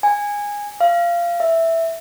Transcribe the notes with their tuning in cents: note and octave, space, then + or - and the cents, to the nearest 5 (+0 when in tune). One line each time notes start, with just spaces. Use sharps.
G#5 -15
F5 -20
E5 +0